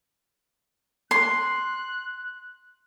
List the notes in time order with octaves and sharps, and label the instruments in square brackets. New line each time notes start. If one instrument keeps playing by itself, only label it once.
[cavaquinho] C6 [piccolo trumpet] F#6